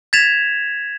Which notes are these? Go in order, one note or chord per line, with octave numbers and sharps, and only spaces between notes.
G#6 A6 B6 E7 F7